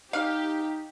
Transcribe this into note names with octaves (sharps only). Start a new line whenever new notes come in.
D#4 G4 F5